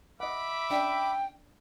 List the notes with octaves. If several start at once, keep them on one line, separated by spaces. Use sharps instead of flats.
D#5 E5 F#5 B5 D6
C#4 D4 F5 G5